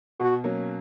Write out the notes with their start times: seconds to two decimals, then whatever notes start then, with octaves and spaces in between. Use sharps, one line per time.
0.20 B2 F#4
0.44 F#3 A#3 C#4